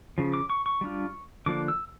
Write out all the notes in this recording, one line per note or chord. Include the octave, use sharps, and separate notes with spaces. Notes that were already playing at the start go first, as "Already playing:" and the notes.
C#3 F3
D6
C#6
C#6
G3 D4 F4
D3 F3 A#3 D4 D6
E6